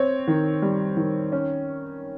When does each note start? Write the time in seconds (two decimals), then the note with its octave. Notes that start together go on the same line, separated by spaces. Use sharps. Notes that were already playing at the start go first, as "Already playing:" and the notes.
Already playing: C4 C#5
0.28 D#3
0.62 G3
0.97 D#3
1.32 C#4